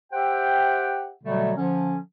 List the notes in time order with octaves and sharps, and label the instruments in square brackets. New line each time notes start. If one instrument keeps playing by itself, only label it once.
[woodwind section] G4 C5 E5 F#5 G5
B2 D3 F#3 G3 A3
D3 F3 C#4